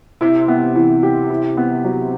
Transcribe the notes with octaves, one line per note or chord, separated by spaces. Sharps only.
C3 E4
B3
E3
G4
E4
B3
F#3